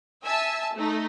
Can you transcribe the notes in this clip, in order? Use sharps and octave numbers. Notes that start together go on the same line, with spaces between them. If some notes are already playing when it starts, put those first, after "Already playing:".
E5 G#5 A5 E6
A3 D#4